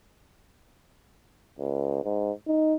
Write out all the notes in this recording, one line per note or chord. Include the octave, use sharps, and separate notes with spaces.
C#2
G#2
D#4